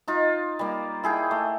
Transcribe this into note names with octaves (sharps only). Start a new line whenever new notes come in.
D#4 F4
G3 A#3
E4 G#4 G5
A3